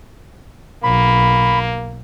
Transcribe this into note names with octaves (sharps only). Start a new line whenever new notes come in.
B1 A#3 B5